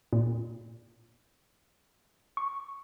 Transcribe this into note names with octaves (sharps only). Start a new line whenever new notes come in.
A#2
C#6